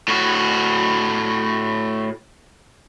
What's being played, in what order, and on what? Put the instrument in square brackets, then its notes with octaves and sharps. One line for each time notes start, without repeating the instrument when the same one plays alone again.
[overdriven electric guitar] A2 F#4